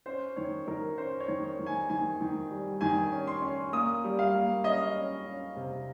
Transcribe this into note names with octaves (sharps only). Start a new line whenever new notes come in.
C#4 C5
D#3 C#5
D#3 A#4
C#4 C5
C#5
D#3
C#5
D#3
G#5
D#3 G#5
D#3
G3
D#3 G#5
C#4
C6
C#4
A#3 D#6
G3
F5
A#3
C#4 D#5
C#4
C#4
C3